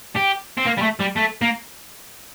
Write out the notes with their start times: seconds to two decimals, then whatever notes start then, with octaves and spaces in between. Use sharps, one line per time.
0.16 G4
0.58 C4
0.67 A#3
0.78 G3
0.83 A3
1.01 G3
1.17 A3
1.42 A#3